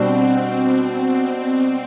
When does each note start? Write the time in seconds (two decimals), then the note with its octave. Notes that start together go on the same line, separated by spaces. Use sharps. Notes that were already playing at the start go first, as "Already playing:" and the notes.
Already playing: B2 G3 C4 D4
0.37 C4
0.77 C4